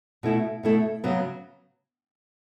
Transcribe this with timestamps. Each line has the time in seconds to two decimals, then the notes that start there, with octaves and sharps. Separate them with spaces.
0.23 B2 A3 E4 A4
0.63 B2 A3 E4 A4
1.04 C#3 F#3 B3